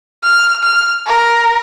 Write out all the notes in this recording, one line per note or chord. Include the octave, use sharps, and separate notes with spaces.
F6
F6
A#4